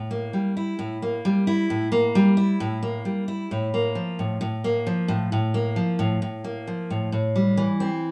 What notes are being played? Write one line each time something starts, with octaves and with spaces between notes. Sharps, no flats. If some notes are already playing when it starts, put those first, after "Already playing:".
Already playing: A2
A#3
G3
E4
A2
A#3
G3
E4
A2
A#3
G3
E4
A2
A#3
G3
E4
A2
A#3
F3
A2
A2
A#3
F3
A2
A2
A#3
F3
A2
A2
A#3
F3
A2
A2
G3
E3
C4